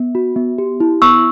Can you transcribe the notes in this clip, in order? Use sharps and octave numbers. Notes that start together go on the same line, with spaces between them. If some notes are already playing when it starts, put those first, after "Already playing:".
Already playing: B3
F#4
B3
G4
E4
B3 C#6 E6